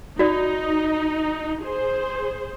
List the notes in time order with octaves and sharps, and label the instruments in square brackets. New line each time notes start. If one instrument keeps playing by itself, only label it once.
[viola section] D#4 [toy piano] F#4 D5
[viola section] G#4 C5